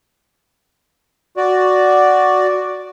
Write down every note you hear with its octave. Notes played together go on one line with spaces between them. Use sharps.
F#4 D5